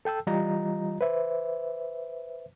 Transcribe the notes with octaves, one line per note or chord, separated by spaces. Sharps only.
A4 G5 A5 E6
E3 G3 F4 D#5 A#5
B4 C5 E5